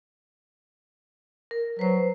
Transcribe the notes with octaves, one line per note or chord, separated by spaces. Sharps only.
A#4
F#3 B4 C5